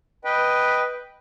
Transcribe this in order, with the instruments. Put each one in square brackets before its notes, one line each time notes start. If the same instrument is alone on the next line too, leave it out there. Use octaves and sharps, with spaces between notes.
[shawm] B4 [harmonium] D#5 G5